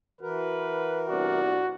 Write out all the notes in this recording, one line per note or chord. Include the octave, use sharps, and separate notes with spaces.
E3 F#4 A#4 B4
G1 C2 F#4 D5